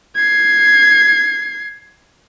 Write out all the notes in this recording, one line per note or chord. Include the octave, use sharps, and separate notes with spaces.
G#6 C7